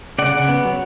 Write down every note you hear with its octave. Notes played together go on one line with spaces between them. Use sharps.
C#3 D5 F#5
C#3
B3
F#3